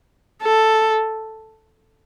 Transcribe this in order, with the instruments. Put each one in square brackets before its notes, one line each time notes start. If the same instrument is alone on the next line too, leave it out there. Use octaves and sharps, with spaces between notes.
[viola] A4